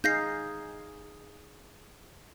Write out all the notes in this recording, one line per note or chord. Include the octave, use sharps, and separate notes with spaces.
D#4 G#4 F5 G6 A#6 C7